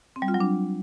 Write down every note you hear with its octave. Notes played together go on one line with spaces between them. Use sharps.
C4
G3
F4
F#3
D4